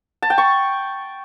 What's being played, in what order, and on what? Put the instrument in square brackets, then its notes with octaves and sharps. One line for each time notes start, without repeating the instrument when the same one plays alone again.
[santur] A5
G5
C#6